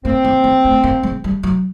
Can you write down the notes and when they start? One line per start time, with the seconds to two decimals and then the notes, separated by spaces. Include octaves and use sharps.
0.04 A#3 C4
0.24 A#3
0.44 A#3
0.64 A3
0.84 A#3
1.03 G#3
1.24 G3
1.43 F#3